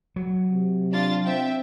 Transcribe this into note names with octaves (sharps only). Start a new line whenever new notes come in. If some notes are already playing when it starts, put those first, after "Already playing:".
F#3
C3
D4 F4 A6
C4 E5 G5